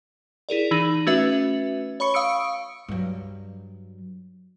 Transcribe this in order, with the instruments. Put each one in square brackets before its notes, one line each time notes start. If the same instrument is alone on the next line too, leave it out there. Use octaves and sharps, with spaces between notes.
[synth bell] E4 G#4 A#4 D5
E3 D#4 F#7
A3 C#4 F#4 B4 E5
C#5 B5 C#6 C#7
F5 C#6 D#6 E6 C#7 D7
[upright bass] G2 F#3